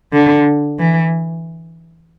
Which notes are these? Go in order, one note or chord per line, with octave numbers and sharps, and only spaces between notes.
D3
E3